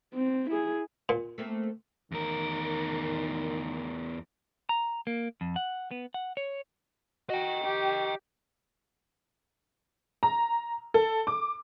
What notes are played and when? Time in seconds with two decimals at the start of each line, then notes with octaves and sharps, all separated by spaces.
0.14 C4
0.50 E4 G#4
1.09 A#2
1.38 A3 A#3 C4
2.12 E2 D#3 A#4
4.69 A#5
5.07 A#3
5.41 F2
5.56 F#5
5.91 B3
6.14 F#5
6.37 C#5
7.30 F#4 D#5 G5
7.64 G4
10.23 A#5
10.94 A4
11.27 D6